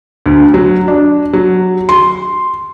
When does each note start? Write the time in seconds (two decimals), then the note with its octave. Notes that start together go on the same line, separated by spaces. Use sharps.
0.26 D2
0.54 F#3
0.88 D4
1.33 F#3
1.89 C6